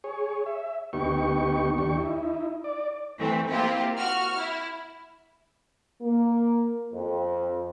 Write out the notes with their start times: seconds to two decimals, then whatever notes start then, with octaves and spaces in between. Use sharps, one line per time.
0.04 G#4 C#5
0.46 E5
0.93 D2 B3 D#4 G4 C#6
1.78 D#2 D4 G4 C#6
1.97 D#4 E4
2.64 D5
3.19 E3 A3 C4
3.51 A#3 C4 E4 F4 G4
3.98 F#4 F6
4.37 E4
6.01 A#3
6.93 F2